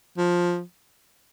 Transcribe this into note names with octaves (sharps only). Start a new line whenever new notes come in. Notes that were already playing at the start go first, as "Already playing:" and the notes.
F3